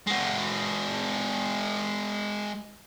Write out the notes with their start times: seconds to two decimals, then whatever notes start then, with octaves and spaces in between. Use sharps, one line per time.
0.07 G#3 F#4